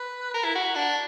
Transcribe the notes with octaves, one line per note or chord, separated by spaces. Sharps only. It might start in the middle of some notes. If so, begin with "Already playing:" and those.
Already playing: B4
A#4
E4
F#4
D4